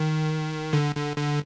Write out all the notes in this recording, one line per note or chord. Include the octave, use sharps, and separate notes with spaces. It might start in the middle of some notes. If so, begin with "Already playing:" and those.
Already playing: D#3
D3
D3
D3